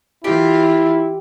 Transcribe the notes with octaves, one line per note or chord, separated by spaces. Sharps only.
E3 E4 F4 G4